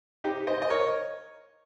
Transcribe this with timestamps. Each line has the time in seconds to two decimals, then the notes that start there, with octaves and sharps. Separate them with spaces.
0.24 D#4 G4
0.47 C5 D#5
0.62 D#5
0.70 A#4 C#5